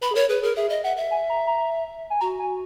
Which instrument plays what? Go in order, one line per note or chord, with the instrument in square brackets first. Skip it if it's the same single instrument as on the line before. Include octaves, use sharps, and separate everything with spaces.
[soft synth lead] B4 [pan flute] B5
[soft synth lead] G#4
[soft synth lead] A#4 [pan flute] C#5
[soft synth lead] G#4 [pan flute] B4
[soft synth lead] G#4 [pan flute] A#4
[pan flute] G#4 [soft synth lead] E5
[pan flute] D#5
[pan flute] E5 [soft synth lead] F#5
[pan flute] E5
[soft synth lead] G#5
A#5
A#5
G#5
[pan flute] F#4 [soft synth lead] A#5
[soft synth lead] G#5